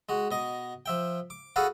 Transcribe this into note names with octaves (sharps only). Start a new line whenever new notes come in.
G#3 F#4
B2 D#5 D#6
F3 E5 G5
D6
F#4 G#4 A4 B4 F5 F#5